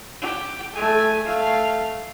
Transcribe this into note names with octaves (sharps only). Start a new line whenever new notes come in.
G4
A3 G#5
A3 F5